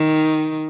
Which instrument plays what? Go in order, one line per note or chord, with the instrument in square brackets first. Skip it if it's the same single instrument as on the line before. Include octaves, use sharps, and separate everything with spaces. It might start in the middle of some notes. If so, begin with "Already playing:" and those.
Already playing: [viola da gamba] D#3